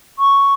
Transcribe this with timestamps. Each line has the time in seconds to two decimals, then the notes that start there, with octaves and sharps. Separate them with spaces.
0.19 C#6